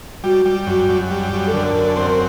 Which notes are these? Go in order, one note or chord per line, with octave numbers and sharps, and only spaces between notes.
G3 F#4
G3
F#2 F#4
F#2
G3 G4
F#2
A4
D3 A#4
F#2
C4 A#4